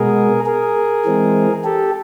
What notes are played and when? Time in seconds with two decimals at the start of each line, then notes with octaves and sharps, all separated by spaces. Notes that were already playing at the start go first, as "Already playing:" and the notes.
Already playing: B2 G#3 B3 G#4 A#4
0.46 G#4 A#4
1.05 E3 G#3 C4
1.64 G4 A4